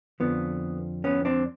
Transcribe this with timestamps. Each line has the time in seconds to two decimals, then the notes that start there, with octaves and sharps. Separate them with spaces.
0.20 F2 D3 F3 B3
1.04 B3 C#4
1.25 C4 D4